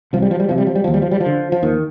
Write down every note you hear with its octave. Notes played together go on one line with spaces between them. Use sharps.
C2 F3
G3
F3
G3
C3 F3
G3
F3
G3
D#2 F3
G3
F3
G3
F3
D3
F3
D#2 D#3